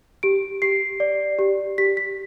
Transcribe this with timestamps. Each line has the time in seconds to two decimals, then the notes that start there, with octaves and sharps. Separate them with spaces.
0.23 G4 D7
0.62 G4 C7
1.00 D5
1.39 G4
1.78 G4 B6
1.97 B6